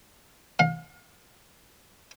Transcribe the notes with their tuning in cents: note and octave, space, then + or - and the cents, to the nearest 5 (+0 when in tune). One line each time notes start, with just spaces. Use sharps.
F5 +35